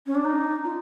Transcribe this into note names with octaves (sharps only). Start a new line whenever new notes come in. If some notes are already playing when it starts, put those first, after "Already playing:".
C#4
D4
D#4
F4